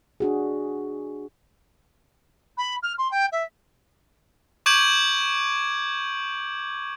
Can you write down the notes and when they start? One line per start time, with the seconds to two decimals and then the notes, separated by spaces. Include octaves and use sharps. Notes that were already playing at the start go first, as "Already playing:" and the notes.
0.20 D4 F#4 G#4
2.57 B5
2.82 F6
2.98 C6
3.11 G5
3.32 E5
4.66 C#6 D6 G6 G#6 D7 F#7